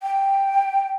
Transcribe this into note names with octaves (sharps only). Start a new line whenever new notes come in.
G5